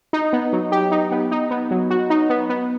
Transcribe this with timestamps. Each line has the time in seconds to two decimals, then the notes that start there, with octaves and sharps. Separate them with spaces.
0.13 D#4
0.33 B3
0.53 F#3
0.72 G4
0.92 D#4
1.11 B3
1.31 D#4
1.51 B3
1.71 F#3
1.90 F#4
2.10 D#4
2.30 B3
2.49 B3